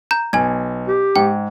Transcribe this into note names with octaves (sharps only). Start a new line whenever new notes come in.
A#5 G6
B1 G#5 G#6
G4
G#2 G5